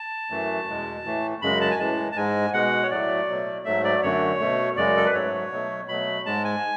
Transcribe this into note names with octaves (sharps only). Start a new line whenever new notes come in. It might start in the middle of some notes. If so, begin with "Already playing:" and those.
Already playing: A5
F#2 E3 A3
E2 B2 G#3
A2 E3 A3
F#2 C#3 G#3 B5
A5
G#5
A2 E3 G#3 A5
A5
G#2 G#3 G#5
B2 G#3 F#5
C#5
A2 F#3 A3 D5
B2 F#3 A3
G#2 F#3 A3 E5
D5
F#2 D3 A3 C#5
B2 A3
F#2 C#3 G#3 D5
A4
B4
G#2 F#3 A3 C#5
B2 F#3 A3
B2 F#3 A3 B5
G#2 G#3 A5
G#5